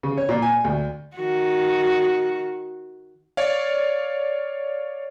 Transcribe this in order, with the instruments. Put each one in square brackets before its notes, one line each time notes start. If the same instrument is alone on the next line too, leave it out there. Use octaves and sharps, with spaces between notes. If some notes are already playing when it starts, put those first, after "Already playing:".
[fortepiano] C#3
C#5
A#2
G#5
D2
[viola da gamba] D#3 F#4
[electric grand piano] C#5 D5 F5